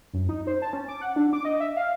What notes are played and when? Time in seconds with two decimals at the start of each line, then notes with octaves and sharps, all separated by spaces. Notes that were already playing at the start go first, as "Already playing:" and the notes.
0.13 F#2
0.29 D#4
0.47 C5
0.62 A5
0.73 C#4
0.88 D6
1.01 F#5
1.16 D4
1.33 D6
1.45 D#5
1.60 E5
1.77 F5